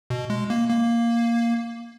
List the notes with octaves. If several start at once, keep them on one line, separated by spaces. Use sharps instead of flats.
B2
G#3
A#3
A#3